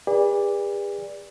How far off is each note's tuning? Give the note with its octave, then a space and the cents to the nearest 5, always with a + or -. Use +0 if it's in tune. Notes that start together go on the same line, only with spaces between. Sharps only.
G#4 -45 B4 -25 D5 +0